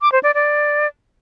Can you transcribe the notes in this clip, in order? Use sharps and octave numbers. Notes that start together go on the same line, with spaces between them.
D6
C5
D5
D5